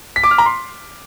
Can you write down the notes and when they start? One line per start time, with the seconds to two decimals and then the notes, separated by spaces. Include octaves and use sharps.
0.16 B6
0.24 D6
0.31 F6
0.38 A#5
0.46 C6